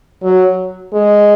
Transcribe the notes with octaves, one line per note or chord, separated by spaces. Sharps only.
F#3
G#3